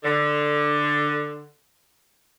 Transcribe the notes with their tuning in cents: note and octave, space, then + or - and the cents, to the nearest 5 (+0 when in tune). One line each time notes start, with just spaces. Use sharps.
D3 +10